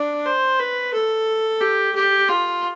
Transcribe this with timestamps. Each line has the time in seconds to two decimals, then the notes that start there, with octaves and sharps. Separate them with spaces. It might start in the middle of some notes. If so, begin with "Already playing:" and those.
Already playing: D4
0.25 C5
0.59 B4
0.93 A4
1.61 G4
1.95 G4
2.29 F4